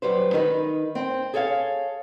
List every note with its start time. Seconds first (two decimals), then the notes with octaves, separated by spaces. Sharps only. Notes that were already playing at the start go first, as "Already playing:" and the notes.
0.02 F#3 G3 B4 C5
0.33 D#3 D#4 A#4 B4
0.95 C4
1.34 G#4 A4 C#5 D#5 F5